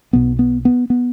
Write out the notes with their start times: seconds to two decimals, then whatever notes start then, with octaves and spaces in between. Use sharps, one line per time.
0.13 B1 B2 B3
0.39 B3
0.65 B3
0.90 B3